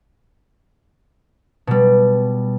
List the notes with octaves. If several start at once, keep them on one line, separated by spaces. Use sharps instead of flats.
B2 G3